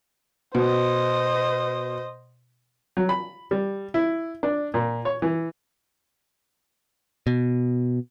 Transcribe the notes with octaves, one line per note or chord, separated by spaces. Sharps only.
B2 C5 D#5
F#3
B5
G3
E4
D4
A#2
C#5
E3
B2